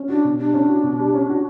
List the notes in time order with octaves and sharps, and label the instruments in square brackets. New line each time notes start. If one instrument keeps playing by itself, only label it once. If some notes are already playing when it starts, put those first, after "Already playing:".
Already playing: [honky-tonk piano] C#4
[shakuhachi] D4 [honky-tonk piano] F#4
[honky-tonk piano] B2
[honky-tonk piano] G3 [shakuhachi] D4
[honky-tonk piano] C#4
F#4
B2
G3
C#4
F#4